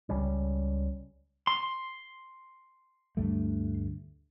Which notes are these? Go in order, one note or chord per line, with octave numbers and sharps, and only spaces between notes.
C#2 C#3 G3 C#4
C6
D2 G2 A3